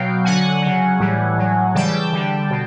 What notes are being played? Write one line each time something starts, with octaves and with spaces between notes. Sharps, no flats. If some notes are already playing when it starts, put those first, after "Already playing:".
Already playing: B2 F#3 F5 G5
D3 F#3 F#5 G#5
C#3 F#3
A2 E3 G3
A2 F#3
C#3 E3 G3 G5 A5
D3 G3
B2